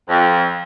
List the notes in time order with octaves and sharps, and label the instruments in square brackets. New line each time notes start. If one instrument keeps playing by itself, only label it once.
[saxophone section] F2